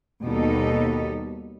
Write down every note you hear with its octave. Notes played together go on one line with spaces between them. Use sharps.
D#2 B2 G3 D#4 A4